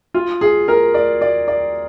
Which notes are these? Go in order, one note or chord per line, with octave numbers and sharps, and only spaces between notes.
F4
G#4
A#4
D5
D5
D5